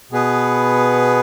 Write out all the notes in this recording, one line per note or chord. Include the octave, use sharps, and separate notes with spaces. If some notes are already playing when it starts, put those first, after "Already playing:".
B2 B3 G#4 B4